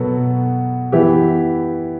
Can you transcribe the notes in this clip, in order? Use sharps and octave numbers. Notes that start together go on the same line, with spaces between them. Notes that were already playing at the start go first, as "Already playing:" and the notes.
Already playing: B2 F#3 B3 F#4 A4
E3 B3 E4 G4